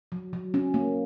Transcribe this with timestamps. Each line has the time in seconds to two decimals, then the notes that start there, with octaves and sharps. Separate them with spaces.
0.12 F#3
0.33 F#3
0.54 C#4
0.74 A#3